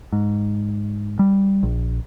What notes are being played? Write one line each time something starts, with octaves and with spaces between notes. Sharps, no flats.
G#2
G3
A#1